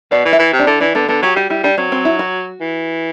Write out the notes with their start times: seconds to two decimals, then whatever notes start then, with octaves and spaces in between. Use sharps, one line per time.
0.11 B2 D5
0.25 E3
0.33 E5
0.39 E3
0.53 C3
0.59 D4
0.67 D3 E4
0.80 E3 D4
0.95 D3 B3
1.08 D3 B3
1.22 F#3 G4
1.36 G3 F#4
1.50 G3 E4
1.63 G3 D4
1.78 F#3 C4
1.92 C4
2.05 E4
2.19 F#4
2.61 E3